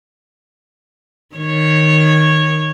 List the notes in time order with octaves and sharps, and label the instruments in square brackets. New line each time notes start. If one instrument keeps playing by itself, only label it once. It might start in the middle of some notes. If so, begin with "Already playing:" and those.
[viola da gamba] D#3 C#5